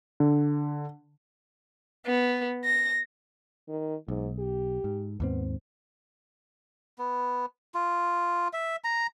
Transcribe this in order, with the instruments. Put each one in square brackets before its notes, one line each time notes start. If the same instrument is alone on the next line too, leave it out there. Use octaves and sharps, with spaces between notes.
[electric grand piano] D3
[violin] B3
A#6
[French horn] D#3
[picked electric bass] B1 [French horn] G#2
[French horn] G4
[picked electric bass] G#2
[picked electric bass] D#2 G#2 C4 [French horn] B3
[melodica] B3
F4
E5
A#5